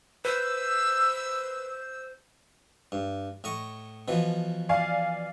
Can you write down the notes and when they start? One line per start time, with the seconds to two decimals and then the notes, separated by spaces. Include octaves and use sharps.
0.25 B4 C5 E6
2.92 G2
3.44 A2 D#5 C#6
4.08 B2 E3 F3
4.69 D5 F5 G#5